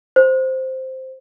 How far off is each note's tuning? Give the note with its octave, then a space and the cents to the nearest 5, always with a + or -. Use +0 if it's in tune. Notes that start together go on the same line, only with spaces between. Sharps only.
C5 +0